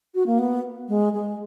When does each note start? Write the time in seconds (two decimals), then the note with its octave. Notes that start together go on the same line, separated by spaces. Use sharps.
0.15 F#4
0.26 A#3
0.39 B3
0.88 G#3
1.13 G#3